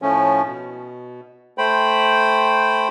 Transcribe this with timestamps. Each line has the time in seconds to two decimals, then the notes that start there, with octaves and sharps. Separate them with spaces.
0.02 A2 F3 A3 C#4
0.47 B2
1.58 A3 C5 G5 B5